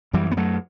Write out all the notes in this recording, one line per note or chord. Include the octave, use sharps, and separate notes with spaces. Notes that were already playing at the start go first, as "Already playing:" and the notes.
F#2 E3 G3
B3
F#3 A3